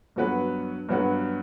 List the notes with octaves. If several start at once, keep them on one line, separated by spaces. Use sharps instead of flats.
G2 F#3 B3 F#4 B4
G2 F#3 B3 F#4 B4